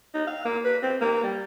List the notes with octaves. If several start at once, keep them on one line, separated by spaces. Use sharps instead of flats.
D#4
F5
A#3
B4
C4
A#3
G3